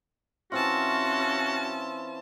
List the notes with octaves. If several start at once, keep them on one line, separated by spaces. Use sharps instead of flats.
E3 C4 C#4 F4 F#4 A5